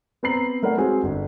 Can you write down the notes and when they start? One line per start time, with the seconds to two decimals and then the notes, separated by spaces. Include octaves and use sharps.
0.23 B3 C4 B4 A#5 C7 F#7
0.63 A3 A#4 B4 C#5 F#5
0.77 G#3 C4 F#4 G#4
1.03 G1